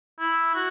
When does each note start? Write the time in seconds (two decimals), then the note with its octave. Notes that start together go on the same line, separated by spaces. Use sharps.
0.20 E4
0.55 F#4